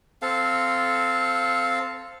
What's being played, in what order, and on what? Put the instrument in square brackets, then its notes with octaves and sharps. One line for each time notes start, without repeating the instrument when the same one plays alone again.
[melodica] C4 A4 F5